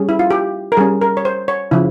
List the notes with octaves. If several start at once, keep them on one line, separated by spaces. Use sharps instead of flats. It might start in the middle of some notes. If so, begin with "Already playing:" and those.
Already playing: G3 C#4 G#4
E4
F4
G4
A#4
G3 C#4 G#4
A#4
C#5
C5
C#5
C#3 F3 E4